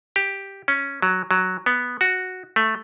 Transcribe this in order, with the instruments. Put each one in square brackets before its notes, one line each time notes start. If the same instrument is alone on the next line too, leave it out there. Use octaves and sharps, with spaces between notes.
[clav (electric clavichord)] G4
C#4
F#3
F#3
B3
F#4
A3